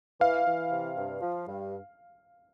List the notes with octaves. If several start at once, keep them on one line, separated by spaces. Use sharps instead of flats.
E3 F5
E3
C3
G2
F3
G2